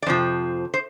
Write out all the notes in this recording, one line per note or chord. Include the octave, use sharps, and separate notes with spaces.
D5
F2 C3 F3 C5
C5